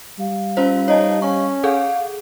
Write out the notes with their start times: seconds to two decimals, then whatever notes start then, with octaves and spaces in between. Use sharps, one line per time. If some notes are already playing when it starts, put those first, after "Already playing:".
0.19 G3 F5
0.57 C#4 F4 C5
0.88 D#4 C#5 D#5 A5
1.22 C#4 C#6
1.63 G#4 A4 F5 F#5